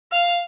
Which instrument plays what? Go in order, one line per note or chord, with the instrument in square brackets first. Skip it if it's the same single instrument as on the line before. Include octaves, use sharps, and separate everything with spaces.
[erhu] F5